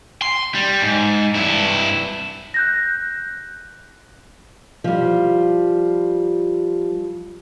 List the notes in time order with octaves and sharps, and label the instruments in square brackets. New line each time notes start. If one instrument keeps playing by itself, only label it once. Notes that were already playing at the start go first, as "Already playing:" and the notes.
[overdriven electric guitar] C6
G3
G#2
G2 E4
[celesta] F#6 G6 A#6
[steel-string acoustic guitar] F3 G3